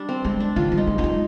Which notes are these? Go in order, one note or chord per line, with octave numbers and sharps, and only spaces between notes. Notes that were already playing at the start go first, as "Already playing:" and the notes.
Already playing: G3 D4
C4
G#3 C4
D4
D#3 F4
G3
D#4
G#3
B3 D#4
G#3